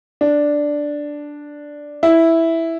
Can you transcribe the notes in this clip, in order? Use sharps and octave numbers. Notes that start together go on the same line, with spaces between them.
D4
E4